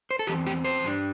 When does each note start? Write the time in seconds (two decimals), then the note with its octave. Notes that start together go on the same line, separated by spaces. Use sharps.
0.11 C5
0.19 A4
0.27 E2 E3 C4 G4
0.47 G4
0.64 C5
0.83 G2 G3 D4